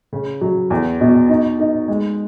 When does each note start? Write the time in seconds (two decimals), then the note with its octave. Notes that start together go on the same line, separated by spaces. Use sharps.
0.13 C#3
0.41 F#3
0.70 E2
1.01 B2
1.29 D#4
1.59 D#4
1.88 G#3